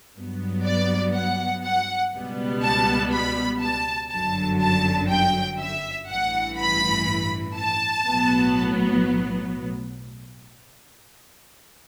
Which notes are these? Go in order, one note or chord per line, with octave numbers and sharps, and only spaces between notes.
G2 F#3 B3
D5
F#5
F#5
C#2 B2 G3 B3
A5
B5
A5
G1 F#2 D3 F#3 A5
A5
G5
E5
A1 G2 E3 F#5
B5
A5
B1 A2 F#3 B3